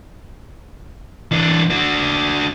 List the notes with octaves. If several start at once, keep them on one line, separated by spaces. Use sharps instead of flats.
E3 D4
D4 F#4